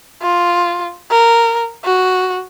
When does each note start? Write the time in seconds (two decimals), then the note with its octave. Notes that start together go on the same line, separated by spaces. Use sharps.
0.22 F4
1.11 A#4
1.85 F#4